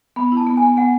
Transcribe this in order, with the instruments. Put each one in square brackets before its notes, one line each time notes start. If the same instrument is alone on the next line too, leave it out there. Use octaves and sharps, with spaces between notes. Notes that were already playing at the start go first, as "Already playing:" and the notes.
[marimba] B3 [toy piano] B5
[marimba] E4
[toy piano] A5
[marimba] B3
[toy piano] G#5
[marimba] B3
[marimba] B3 [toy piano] F#5